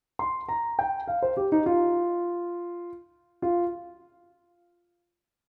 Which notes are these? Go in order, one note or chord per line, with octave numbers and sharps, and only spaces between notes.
C6
A#5
G5
F5
C5
G4
D#4
F4
F4